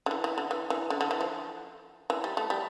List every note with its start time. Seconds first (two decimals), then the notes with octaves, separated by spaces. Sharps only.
0.06 D3
0.11 E3
0.24 E3
0.38 D3
0.51 E3
0.70 E3
0.90 D3
1.01 D3
1.11 E3
1.21 F3
2.10 E3
2.24 G3
2.37 A3
2.50 G3